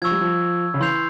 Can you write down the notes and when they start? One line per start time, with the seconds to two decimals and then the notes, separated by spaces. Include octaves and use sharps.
0.02 F3 C#6 E6 G#6
0.11 G3
0.21 F3
0.74 C#3
0.80 E3 C6 G6 C7 F7